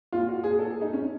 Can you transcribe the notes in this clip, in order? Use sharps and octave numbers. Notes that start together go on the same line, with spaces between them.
A#2 F4
F#4
G#4
A4
G#4
D#4
C#4